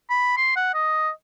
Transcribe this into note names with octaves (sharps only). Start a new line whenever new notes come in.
B5
C6
F#5
D#5